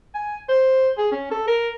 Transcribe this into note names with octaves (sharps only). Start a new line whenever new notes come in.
G#5
C5
G#4
C#4
A4
A#4